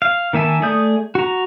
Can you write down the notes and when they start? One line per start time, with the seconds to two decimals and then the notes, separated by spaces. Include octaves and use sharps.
0.02 F5
0.33 D#3 A#3 E5 G#5 A5
0.62 A3 G#4 D5 D#6 G6
1.15 F#4 A#5